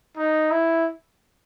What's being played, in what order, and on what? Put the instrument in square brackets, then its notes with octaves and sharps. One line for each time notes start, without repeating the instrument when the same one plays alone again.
[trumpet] D#4
E4